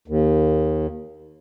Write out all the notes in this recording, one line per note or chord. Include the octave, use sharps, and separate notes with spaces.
D#2